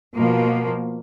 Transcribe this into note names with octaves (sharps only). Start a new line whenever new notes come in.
B2 F3 A#3